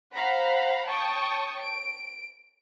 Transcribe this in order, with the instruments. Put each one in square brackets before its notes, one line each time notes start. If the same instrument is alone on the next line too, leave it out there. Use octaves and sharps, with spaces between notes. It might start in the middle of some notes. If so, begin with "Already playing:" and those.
[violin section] C5 F5 F#5 A#5 B5
C#5 G5 A5 C#6 D#6
D7